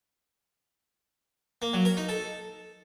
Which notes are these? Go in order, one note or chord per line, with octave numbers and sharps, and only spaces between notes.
A#3
F#3
A#4
D#4
A4